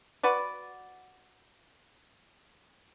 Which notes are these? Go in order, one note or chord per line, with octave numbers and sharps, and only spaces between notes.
F#4 B4 D5